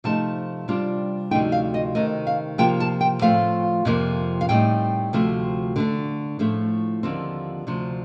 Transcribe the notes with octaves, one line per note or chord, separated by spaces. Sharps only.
C3 F3 A3 D#4 A5
C3 G3 D4 F4
D2 C3 F3 A3 D#4 G5
F5
D#5
C3 D#3 A3 D#5
F5
C3 F3 A#3 F4 G5
A5
G5
A2 F3 A3 C4 F4 F5
F2 C3 F3 A#3
F5
A2 G3 C4 D#4 G5
D2 C3 F3 A3 C4
D3 A3 D4
A2 F3 A3
D#2 D3 F3 C4
D2 C3 F3